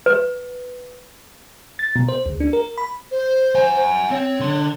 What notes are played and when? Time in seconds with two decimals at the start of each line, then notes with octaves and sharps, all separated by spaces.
0.06 B4
1.79 A6
1.96 B2
2.08 C5
2.26 D2
2.40 D4
2.53 A#4
2.78 B5
3.11 C5
3.55 F#5 G#5
4.11 C4 C#5
4.40 D3 C6